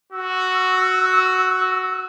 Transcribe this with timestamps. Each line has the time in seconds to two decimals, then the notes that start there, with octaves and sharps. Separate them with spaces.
0.13 F#4 E6